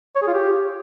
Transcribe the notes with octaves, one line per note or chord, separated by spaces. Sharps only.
C#5
G#4
F4
G4